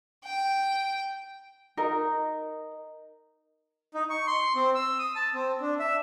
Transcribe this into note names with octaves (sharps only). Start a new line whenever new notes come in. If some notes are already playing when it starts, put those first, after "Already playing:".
G5
D#4 A#4
D#4
C#6
C6
C4
E6
D#6
A5
C4
D4
E5